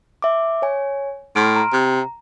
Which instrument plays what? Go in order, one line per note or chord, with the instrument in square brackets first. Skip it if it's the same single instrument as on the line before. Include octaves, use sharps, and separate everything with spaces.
[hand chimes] E5 D6
C#5 G#5
[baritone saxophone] A2 [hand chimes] C6 F6 D7
[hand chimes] A#5
[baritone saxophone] C3